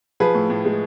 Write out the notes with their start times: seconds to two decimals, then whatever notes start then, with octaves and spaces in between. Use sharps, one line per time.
0.20 F3 G#4 B4
0.35 A2
0.50 A2
0.65 G#3